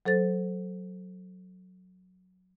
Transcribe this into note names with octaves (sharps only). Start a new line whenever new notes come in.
F#3 A4 C5 A6